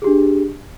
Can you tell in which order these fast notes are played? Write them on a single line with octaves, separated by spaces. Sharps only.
G#4 G4 D4